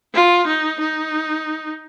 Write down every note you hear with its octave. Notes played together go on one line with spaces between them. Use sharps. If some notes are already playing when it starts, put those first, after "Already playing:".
F4
D#4
D#4